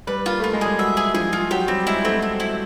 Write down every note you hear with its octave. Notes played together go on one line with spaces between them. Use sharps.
G3 B4
A#3 F4
A3 F4
G#3
G3 G#4
F#3 E5
G#4
F3 G#4
F4
F#3 G4
G3 C4
G#3 E4
A3 C4
C4
E4